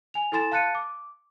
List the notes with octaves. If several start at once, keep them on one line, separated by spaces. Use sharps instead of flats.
G#5 F7
E4 A4 G#5 C6 A6 E7
F5 A5 F#6 A6 C#7 D#7
D6